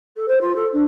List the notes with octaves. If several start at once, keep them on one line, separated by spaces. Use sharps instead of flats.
A4
C5
F4
A4
D4